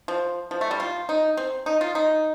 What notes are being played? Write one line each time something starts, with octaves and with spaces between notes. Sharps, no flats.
F3
F3
A3
G3
F4
D#4
C4
D#4
F4
D#4